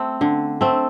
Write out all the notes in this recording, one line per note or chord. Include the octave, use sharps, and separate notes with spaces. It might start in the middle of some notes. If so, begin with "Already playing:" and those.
Already playing: A3 C4
D3
A3 C4